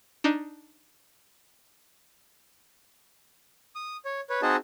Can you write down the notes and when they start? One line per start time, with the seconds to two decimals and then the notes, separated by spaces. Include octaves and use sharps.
0.24 D4 D#4
3.75 D#6
4.05 C#5
4.30 B4 C#5
4.42 C4 D#4 F#4 G#4 D#5 A5